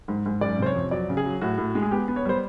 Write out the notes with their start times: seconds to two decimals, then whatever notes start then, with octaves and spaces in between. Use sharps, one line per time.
0.08 G#2
0.26 G#2
0.41 F#1 D5
0.59 C3 C5
0.66 C#5
0.76 F2
0.91 F#3 D5
1.09 C#3
1.17 G#4
1.25 F#3
1.41 A2 F#4
1.58 A2
1.75 G#3
1.82 G#4
1.91 B3 G4
2.08 B3
2.16 C#5
2.25 G3 C5